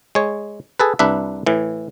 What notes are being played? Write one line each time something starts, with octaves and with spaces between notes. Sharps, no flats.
G#3 C#5
G#4 A4 B4
C2 D4 B4 E5
A2 E3